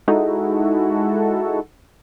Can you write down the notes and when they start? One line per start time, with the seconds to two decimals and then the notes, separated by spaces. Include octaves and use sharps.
0.08 G#3 D#4 E4 F#4 A4